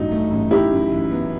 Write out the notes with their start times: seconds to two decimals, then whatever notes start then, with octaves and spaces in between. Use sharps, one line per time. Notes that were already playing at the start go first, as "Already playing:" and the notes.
Already playing: A1 G2 F#3 A3 D#4
0.12 A3
0.31 A1
0.51 D#4 E4 G4
0.71 F#2
0.92 E3
1.11 B3